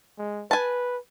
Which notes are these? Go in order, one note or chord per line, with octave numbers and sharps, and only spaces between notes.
G#3
B4 G#5 A5